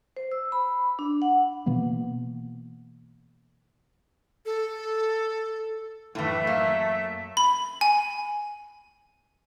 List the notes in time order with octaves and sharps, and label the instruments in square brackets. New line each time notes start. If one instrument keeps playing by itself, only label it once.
[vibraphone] C5
E6
B5
D4
F#5
[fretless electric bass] B2 E3 A#3 B3
[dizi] A4
[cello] F#2 E5 [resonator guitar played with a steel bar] A2 E3 [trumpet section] A3
[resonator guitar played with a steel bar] A#3
[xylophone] B5
G#5